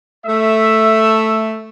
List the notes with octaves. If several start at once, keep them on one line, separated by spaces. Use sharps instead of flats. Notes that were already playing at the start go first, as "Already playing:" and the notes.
A3 E5